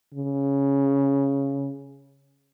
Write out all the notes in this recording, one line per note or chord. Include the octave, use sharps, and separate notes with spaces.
C#3